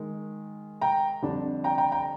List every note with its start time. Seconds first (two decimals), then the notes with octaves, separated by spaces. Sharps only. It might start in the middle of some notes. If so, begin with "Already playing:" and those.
Already playing: D#3 G#3
0.81 G5 A#5
1.22 F2 D3 G3 D4
1.64 G5 A#5
1.78 G5 A#5
1.92 G5 A#5